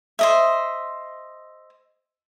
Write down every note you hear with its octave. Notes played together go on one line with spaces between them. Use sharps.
C5 D#5 E5